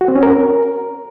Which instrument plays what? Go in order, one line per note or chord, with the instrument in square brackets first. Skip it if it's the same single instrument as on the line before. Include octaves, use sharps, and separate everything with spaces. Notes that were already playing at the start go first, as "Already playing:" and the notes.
[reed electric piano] F#4
C4
C#4
A#4